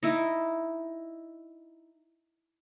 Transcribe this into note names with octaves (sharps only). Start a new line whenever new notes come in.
D#4 E4